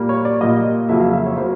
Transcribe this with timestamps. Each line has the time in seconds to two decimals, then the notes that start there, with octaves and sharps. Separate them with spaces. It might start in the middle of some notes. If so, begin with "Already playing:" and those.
Already playing: A#2 G3 A#3
0.09 C#5
0.25 D5
0.41 A#2 G3 A#3 D#5
0.89 F2 C#3 F#3 A#3 E5
1.01 F5
1.13 E5
1.26 C#5
1.37 C#3 F#3 A#3 C5